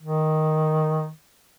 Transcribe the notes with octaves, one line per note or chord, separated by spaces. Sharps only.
D#3